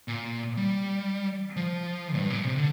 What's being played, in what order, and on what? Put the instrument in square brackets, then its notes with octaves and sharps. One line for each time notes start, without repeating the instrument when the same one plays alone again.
[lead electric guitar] A#2
G3
F3
G2
A#2
C3
D3